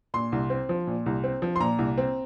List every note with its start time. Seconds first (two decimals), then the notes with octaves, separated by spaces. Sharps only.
0.14 A#2 C6
0.32 C2
0.50 C4
0.69 F3
0.87 A#2
1.06 C2
1.24 C4
1.42 F3
1.56 C6
1.60 A#2 A#5
1.79 C2
1.98 C4